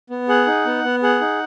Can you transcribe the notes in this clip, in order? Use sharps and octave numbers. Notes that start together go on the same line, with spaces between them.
B3
G#4 F#5
D#4
B3
B3
G#4 F#5
D#4